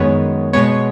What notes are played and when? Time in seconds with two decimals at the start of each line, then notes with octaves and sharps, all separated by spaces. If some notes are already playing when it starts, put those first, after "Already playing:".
Already playing: F#2 D#3 G#3 B3 C#5
0.53 B2 G#3 B3 C#5